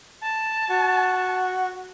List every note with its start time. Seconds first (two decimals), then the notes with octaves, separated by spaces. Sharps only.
0.23 A5
0.70 F#4